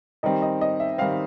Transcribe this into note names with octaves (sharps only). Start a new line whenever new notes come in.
D#3 G3 C4 D#5
D#5
D#5
E5
D#3 G3 C4 F5